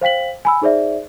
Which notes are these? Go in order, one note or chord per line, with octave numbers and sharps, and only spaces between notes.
C5 F5 G5 B6 F#7
G#5 B5 E6
D#4 G#4 C5 D5 E5